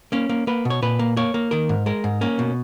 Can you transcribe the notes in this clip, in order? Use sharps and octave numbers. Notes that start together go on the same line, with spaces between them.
A#3 C#4
A#3
A#3 B4
B2
C#5
A#2 B4
A#3
A#3 C#5
A#3
D#3 A#4
G#2
G#3 A#4
G#2
A#3 C#4
B2